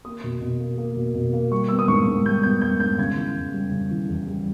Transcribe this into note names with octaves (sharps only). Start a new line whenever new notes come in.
A#3 D#6
B2
B2
A#3
A#3
B2
B2
A#3
G3 C#6
B3 E6
D#6
G#2 C#6
G#2
G3 G6
B3 G6
G#2 G6
G#2 G6
C#3 G#6
E3
E2
G3
C#3
E3
E2
G3